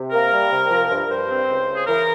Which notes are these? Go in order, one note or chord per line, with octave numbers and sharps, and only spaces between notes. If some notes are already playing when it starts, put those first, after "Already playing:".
Already playing: C3
A#3 A#4
G3
C3
F3
G2
G2 C5
C4
C#2
C#3
G#4
E3 A#4